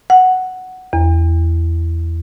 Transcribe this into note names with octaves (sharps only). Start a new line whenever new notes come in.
F#5
E2